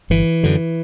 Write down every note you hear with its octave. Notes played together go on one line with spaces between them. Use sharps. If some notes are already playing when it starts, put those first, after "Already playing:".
G1 E3
F#2 D3